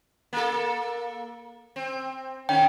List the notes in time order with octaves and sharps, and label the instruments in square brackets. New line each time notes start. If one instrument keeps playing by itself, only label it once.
[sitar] A#3 A4
C4
[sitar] D#3 C#4 [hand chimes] G5